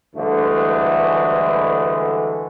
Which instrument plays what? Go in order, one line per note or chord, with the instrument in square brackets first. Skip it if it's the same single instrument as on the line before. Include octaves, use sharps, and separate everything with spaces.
[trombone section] D2 G2 D3 E3 G#3 A3